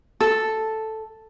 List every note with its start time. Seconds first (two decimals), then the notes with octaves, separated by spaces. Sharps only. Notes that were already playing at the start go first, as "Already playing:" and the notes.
0.21 A4